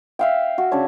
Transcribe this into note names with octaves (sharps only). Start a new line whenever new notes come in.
E5 F5 G5
F#4
C#3 D4 C#5